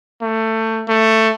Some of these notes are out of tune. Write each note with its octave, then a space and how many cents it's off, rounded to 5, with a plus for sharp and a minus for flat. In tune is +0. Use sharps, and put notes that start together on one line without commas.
A3 +20
A3 +10